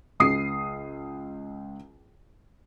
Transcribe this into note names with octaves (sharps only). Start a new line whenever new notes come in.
C#2 D#6 C7